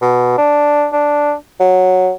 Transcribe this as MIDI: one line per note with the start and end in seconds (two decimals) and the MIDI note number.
0.02 0.37 47
0.38 0.88 62
0.93 1.34 62
1.60 2.12 54